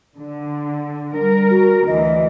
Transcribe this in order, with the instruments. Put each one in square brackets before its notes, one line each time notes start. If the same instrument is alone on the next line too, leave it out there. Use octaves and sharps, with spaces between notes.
[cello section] D3
G3 A#4
[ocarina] F#4
[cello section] D2 E3 [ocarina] D#5